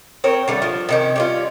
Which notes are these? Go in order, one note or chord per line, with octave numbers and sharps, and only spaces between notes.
C4 A#4 C#5
D3 G3 A3
F3
C3 D#3 C#4
G3 C#4 F4